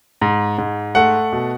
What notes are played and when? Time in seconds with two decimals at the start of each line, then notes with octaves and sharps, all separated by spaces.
0.21 G#2
0.58 G#2
0.95 A3 F#5
1.33 B2